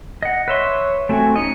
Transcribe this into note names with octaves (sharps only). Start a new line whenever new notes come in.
D#5 F#5
B4 C#5 E5 C6
A3 C4 F#4 G#5
C#4 D#4 D#5 C#7